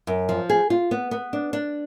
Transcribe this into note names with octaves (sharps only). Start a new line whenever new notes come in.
F#2
F3
G#4
F4
B3
B3
D4
D4